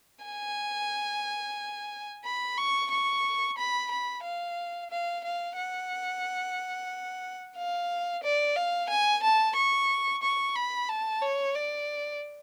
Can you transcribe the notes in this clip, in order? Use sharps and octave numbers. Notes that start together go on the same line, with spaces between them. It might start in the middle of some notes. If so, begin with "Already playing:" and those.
G#5
B5
C#6
C#6
B5
B5
F5
F5
F5
F#5
F5
D5
F5
G#5
A5
C#6
C#6
B5
A5
C#5
D5